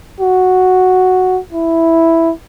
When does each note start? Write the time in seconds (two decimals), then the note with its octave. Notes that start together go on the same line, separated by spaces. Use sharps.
0.21 F#4
1.53 E4